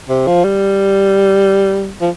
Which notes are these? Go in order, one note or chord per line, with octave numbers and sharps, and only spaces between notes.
C3
F3
G3
F3